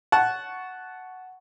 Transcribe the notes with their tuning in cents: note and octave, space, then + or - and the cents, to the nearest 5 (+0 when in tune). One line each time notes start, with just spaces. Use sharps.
F#5 +0 A5 -15 C#6 +0